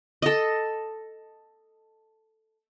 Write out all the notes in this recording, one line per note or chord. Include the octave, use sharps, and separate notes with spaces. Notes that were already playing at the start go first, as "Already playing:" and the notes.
A4 D#5